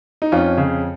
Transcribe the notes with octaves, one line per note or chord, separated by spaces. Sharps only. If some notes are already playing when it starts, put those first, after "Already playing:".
D#4
F2 C#4 F4
C#3